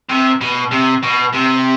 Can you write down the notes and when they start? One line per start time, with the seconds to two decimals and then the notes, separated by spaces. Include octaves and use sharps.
0.10 C3
0.41 B2
0.71 C3
1.03 B2
1.34 C3